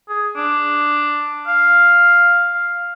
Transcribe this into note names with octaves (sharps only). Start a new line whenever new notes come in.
G#4
D4
F5
F5